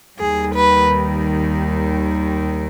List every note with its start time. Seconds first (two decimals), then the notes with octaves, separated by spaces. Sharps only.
0.18 D#2 D#3 G3 G#4
0.55 B4